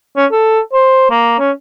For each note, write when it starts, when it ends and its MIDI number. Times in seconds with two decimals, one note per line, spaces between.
0.16 0.26 61
0.31 0.60 69
0.73 1.07 72
1.10 1.36 58
1.39 1.51 61